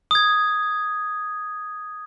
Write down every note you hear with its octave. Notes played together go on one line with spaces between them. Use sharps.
D#6 G#6